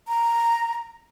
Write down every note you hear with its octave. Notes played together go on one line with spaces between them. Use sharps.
A#5